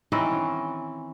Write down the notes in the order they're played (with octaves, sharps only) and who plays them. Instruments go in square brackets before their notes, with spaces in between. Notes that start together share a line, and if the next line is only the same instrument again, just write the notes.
[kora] D#3 E3 C4 C#4